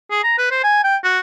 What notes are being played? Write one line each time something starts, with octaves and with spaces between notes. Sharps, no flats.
G#4
A#5
B4
C5
G#5
G5
F#4